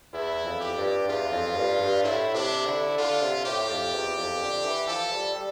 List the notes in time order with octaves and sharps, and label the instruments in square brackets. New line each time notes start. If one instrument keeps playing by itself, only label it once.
[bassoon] E2 [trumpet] E4
[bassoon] F2
[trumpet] G4
[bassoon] G2
[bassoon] E2 [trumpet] F4
[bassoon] F2
G2
G2
[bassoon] A2 [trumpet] E4
[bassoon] C3 [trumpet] D4
[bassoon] D3 [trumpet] E4
[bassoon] D3 [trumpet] F4
[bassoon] C3
[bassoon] A2 [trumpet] G4
[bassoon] F2
E2
F2
D3
E3
[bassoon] F3 [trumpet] A4
[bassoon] G3
G3